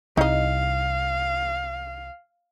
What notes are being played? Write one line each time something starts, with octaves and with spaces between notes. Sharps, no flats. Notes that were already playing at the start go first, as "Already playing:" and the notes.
C2 D#4 D#5 F5